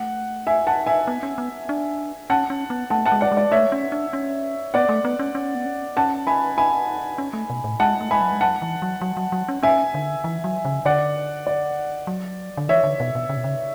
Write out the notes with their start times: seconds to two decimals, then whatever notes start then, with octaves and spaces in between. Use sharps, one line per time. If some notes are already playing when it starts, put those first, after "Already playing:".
Already playing: A3 F#5
0.47 E5 G#5
0.67 F#5 A5
0.86 E5 G#5
1.07 B3
1.23 C#4
1.38 B3
1.69 D4
2.30 C#4 F#5 A5
2.50 C#4
2.70 B3
2.90 A3 F#5 A5
3.06 F#5 A5
3.12 G#3
3.21 D5 F#5
3.32 G#3
3.37 D5
3.51 A3 C#5 E5
3.72 C#4
3.92 D4
4.13 C#4
4.74 B3 D5 F#5
4.89 A3
5.05 B3
5.19 C#4
5.35 C#4
5.55 B3
5.66 C#4
5.97 C#4 F#5 A5
6.27 G#5 B5
6.57 G#5 B5
7.18 C#4
7.33 A3
7.50 B2
7.64 A2
7.80 G#3 F#5 A5
8.01 A3
8.11 G#3 G#5 B5
8.21 F#3
8.32 G#3
8.41 F#3 F#5 A5
8.62 E3
8.82 F#3
9.01 F#3
9.17 F#3
9.32 F#3
9.49 C#4
9.63 C#4 E5 G#5
9.94 D3
10.24 E3
10.44 F#3
10.65 C#3
10.85 D3 D5 F#5
11.47 D5
12.07 F#3
12.57 D3
12.68 E3 C#5 E5
12.83 D3
13.00 B2
13.15 B2
13.29 C#3
13.37 B2
13.44 C#3